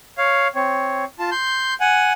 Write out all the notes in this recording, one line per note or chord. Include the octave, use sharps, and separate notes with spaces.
C#5 F5
C4 C#5
F4 A5
C6 G6
F#5 G#5